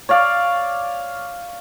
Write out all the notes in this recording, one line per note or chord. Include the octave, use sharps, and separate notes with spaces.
C#5 D5 F5